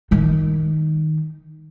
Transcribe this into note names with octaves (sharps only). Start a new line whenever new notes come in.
D#3 D#4